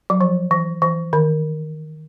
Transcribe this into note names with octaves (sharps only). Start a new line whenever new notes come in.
F#3
F3
E3
E3
D#3